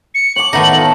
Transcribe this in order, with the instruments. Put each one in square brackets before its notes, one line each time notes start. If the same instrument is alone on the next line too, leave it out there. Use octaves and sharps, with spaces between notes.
[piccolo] C#7
[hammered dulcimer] C#5 D6 [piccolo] F#7
[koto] A2 D#3 D#4 [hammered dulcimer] A3 B3
[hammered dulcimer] F4 A4